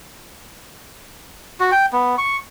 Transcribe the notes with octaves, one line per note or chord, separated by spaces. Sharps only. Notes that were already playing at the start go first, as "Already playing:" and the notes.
F#4
G5
B3
C#6